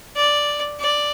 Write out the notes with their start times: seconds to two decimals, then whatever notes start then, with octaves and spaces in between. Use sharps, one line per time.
0.16 D5
0.79 D5